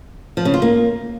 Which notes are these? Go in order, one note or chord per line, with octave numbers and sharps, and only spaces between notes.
F3
C#3
F4
A#3